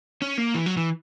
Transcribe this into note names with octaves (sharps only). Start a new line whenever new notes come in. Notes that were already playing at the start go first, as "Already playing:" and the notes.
C#4
A#3
E3
F#3
E3